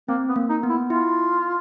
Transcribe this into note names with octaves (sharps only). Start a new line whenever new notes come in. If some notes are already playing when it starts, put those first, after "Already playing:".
A#3 C4
B3
A#3
D#4
B3
E4
E4 F4